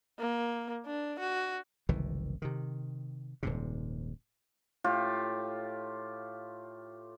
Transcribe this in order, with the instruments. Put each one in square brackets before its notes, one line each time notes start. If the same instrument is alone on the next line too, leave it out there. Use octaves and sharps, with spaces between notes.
[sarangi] A#3
D4
F#4
[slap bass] F#1 C2 D#3 E3
C3 D#3
D#1 G#2 C3
[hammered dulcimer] A2 F4 G4